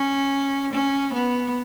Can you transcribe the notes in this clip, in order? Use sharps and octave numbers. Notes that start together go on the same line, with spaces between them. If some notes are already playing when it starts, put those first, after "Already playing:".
Already playing: C#4
C#4
B3